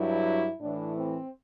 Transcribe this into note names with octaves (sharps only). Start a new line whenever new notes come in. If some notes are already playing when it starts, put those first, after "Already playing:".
Already playing: G2 F#3 E4
A2 E3 D4
C4